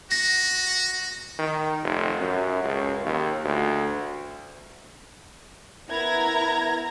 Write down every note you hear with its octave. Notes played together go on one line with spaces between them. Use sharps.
F#4 A#6
D#3
F1
F#2
C#2
D#2
D2
B3 E4 A#4 A#5 G#6 A#6